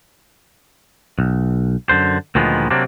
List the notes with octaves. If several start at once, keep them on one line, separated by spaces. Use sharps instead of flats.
B1
F#2 D3 C5
D2 A#2 D#3 F3 G#3 B3
C3 F#3 A#3 C4 D4